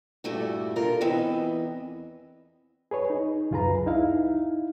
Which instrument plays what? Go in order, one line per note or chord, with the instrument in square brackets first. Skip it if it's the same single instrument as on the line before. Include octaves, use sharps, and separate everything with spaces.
[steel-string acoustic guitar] G2 A#2 G3 A3 E4 F#4
A#2 D3 F4 A#4
E2 E3 B3 C4 D#5
[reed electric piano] G#4 B4 C#5
D#4
C#2 F#2 F4 G#4 B4 A#5
D#4 E4 F5